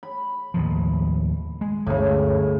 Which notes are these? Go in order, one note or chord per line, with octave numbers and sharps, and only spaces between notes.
B5
D#2 A2 F3
G#3
G1 D2 A2 C#3